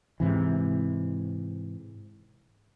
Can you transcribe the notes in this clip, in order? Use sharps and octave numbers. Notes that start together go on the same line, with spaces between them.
G#2 C3 E3